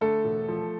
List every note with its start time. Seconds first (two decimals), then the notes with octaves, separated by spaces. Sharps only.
0.01 D3 A3 A4
0.25 E1
0.48 F3